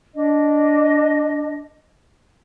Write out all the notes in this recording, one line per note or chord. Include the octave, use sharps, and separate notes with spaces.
D4 D#5